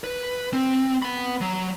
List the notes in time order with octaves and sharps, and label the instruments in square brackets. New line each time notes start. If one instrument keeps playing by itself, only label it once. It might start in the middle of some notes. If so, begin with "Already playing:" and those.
[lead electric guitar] B4
C4
B3 B5
F#3